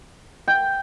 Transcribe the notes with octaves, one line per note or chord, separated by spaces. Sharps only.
G5